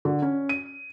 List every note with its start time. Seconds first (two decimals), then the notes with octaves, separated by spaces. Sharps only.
0.05 D3
0.22 C#4
0.49 D#7